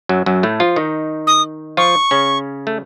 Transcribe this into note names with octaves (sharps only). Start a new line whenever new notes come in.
F#2 F#3
F#2 F#3
A2 A3
F3 F4
D#3 D#4
D#6
F3 F4 C#6
C#3 C#4
A3